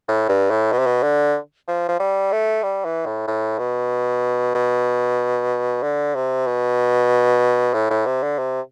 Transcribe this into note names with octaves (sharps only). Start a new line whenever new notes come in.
A2
G2
A2
B2
C3
B2
D3
F3
F3
G3
A3
G3
E3
A2
A2
B2
B2
D3
C3
B2
A2
A2
C3
D3
C3